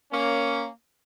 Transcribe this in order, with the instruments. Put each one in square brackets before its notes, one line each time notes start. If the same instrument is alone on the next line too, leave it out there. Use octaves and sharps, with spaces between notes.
[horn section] A#3 C#4